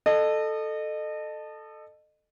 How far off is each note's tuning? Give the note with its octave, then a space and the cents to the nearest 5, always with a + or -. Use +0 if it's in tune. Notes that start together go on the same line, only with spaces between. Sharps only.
A4 +0 D#5 -30